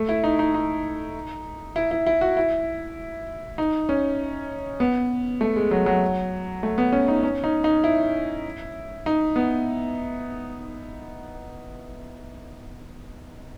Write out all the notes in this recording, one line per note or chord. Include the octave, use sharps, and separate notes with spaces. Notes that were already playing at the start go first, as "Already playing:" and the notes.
Already playing: A3
E4
D#4
D#4
D#4
E4
E4
E4
F#4
E4
D#4
C#4
B3
A3
G#3
F#3
F#3
A3
B3
C#4
D#4
C#4
D#4
D#4
E4
D#4
B3